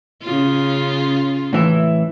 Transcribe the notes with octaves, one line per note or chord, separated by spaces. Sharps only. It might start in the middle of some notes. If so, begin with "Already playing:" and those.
C#3 C#4 F4
A2 E3 E4